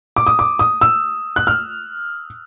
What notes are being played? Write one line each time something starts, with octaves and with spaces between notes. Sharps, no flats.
D6
D#6
D6
D#6
E6
F#6
F6